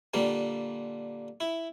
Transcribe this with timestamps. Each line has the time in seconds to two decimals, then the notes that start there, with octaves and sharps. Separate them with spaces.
0.14 A#2 D3 G3 A#3
1.40 E4